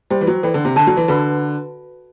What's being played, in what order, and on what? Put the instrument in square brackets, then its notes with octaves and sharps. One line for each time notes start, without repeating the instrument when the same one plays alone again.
[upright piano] G3 [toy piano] C5 G5 C6
[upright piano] E3
F#3
[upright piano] E3 [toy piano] A4 D5 G5 B5
[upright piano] D3
C3
[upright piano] D3 [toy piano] A4 D5 F#5 A5 C6
[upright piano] F#3
E3
[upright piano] D3 [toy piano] F#4 B4 F#5 B5